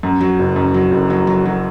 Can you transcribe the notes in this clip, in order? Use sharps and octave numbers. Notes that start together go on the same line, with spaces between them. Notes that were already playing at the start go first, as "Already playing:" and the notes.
F#2
F#3
F#1
F#2
F#3
F#1
F#3
F#3
F#3